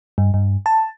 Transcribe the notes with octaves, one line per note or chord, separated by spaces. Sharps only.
G2
G2
A5